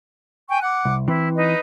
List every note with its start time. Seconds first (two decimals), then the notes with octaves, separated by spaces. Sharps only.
0.49 G5 G#5 C#6
0.62 F#5 D6 F#6
0.85 C2
1.08 E3 C4 E4
1.35 D#4 B4 D#5